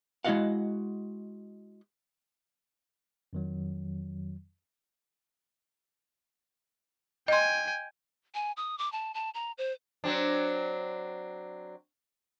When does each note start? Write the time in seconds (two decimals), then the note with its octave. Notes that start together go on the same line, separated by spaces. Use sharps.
0.25 G#3 E4 F#4 D#5 F5 F#5
3.33 F2 D#3 F#3
7.28 D#5 G5 G#5 C6
8.35 G#5
8.57 D#6
8.78 D6
8.92 A5
9.14 A5
9.34 A#5
9.58 C5
10.04 F#3 C4 D4